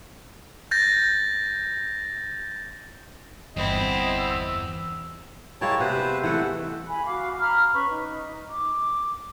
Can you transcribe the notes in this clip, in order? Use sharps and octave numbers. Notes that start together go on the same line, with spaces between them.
G6 A6 A#6
G1 E2 C4 E4 D#5
E6
G#3 A#3 E4 C#5 G5 A5
C3 B3 B4 C5
E5
E3 A3 A4 F#5
G#5 B5
F#4 F5 D6
A#5 B5 F6
C#4 B4 B5 C#6
D#4
D6